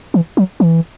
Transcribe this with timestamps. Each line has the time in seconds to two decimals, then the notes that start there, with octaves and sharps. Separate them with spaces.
0.14 E3
0.37 F#3
0.60 E3